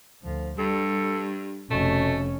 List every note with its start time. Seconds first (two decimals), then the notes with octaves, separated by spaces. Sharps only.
0.24 D2 F3
0.58 G2 G3 A4
1.71 F1 B2 A3 C#4